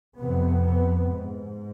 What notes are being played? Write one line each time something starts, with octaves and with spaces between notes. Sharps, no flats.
F2 C3 B3
B3
G#2